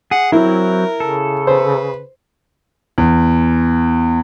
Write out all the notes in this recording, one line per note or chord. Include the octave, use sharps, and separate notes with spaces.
G#4 F#5
F#3 C4 E4 A#4
C#3 A4
B4 C5
E2